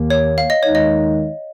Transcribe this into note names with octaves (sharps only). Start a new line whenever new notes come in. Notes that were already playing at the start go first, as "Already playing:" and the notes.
Already playing: D#2 D#3 A#3
C#5
F5
D#5
D#2 D#3 G#3 D#4 C#5
D#5